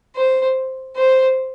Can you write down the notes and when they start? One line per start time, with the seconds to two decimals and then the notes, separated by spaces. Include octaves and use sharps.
0.16 C5
0.96 C5